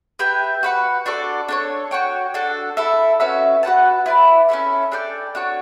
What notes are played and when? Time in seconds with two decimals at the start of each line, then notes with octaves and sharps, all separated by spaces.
0.19 G4 B4 E5 G5
0.63 F#4 B4 F#5
1.06 D4 F#4 A4 D5
1.49 D4 A4 C#5
1.91 F#4 C#5 G5
2.34 D4 F#4 A4
2.77 E4 A4 E5
3.20 C#4 F#4 B4 E5
3.63 F#4 B4 F#5 A5
4.06 E4 B4 D5
4.49 C#4 E4 A4 E5
4.92 D4 A4 D5 G5
5.35 D4 F#4 C#5